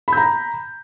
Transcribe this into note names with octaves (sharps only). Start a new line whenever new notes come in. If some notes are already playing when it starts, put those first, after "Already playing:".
A#5 B5 G6